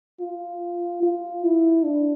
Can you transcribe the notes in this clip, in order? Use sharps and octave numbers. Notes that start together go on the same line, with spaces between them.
F4
F4
E4
D4